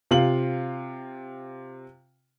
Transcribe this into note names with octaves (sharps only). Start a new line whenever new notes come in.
C3 F4 F5 F#7